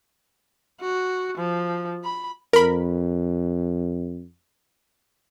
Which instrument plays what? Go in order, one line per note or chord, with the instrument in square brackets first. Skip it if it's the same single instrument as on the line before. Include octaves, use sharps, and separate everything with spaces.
[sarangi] F#4
F3
B5
[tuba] F2 [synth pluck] A#4 B5